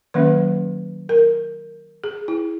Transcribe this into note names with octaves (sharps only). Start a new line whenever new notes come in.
D#3 F#3 A#3 C#4 B4
A#4
G#4
E4